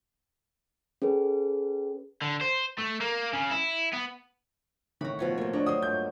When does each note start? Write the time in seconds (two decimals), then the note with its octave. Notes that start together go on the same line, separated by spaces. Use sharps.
1.02 C#4 G#4 A4 B4
2.22 D3
2.41 C5
2.78 A3
3.01 A#3
3.34 C#3
3.51 E4
3.93 B3
5.01 A2 D#3 F#4 A#5 B5 C#6
5.19 B2 F3 C#5
5.38 A3 A#3 C#5
5.53 D4 A#4 C#5 D#5
5.66 F#3 C5 G5 D#6
5.82 G2 A#2 A3 G6